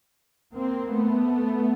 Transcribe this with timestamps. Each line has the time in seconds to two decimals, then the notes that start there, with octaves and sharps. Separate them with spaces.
0.53 A#3 C4
0.92 A3 B3